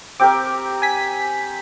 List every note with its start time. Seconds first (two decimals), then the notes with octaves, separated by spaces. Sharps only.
0.20 C4 G4 A#4 G5 D6
0.82 G#5 B6